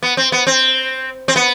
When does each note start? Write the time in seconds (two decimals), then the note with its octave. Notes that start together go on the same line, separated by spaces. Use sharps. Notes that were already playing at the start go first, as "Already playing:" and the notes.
0.03 B3
0.17 C4
0.32 B3
0.47 C4
1.28 C4
1.36 B3